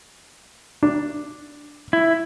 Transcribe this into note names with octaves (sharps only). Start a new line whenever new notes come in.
D4
E4